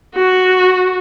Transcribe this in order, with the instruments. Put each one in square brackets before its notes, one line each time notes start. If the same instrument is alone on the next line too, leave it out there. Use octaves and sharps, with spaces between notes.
[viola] F#4